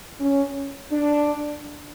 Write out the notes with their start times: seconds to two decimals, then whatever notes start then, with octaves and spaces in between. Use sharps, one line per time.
0.20 C#4
0.92 D4